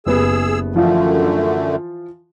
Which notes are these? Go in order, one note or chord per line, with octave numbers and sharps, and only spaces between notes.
F#1 B3 G4 G#4 E6
F#2 D3 E3 F3 A3 F4